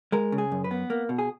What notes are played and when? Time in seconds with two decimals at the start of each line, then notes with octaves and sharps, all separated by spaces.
0.12 G#3 A#4
0.32 C#3
0.38 G#4
0.52 F#2
0.64 B4
0.71 B3
0.90 A#3
1.09 B2
1.19 G#4